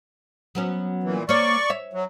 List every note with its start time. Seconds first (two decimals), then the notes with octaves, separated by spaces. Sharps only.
0.55 F#3 B3 C#4
1.03 A#2 E3
1.29 A#3 C#5 D5 C#6
1.70 C#5 E5
1.93 F#3